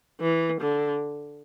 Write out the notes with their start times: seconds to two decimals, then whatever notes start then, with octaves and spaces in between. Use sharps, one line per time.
0.20 E3
0.61 D3